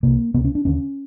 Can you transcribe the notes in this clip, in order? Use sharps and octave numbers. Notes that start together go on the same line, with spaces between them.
C2 C3 A#3
C#2 C3 B3
C#4
D4
D#2 D3 C#4